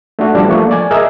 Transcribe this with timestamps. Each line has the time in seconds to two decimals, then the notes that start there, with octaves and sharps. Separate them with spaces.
0.19 A3 D4 F#4
0.35 F3 G3 D4
0.48 F3 A3 A#3 C#6
0.71 D5 G#5
0.91 G#4 A#4 D#5 E5